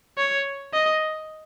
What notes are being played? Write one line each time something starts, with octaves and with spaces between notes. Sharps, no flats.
C#5
D#5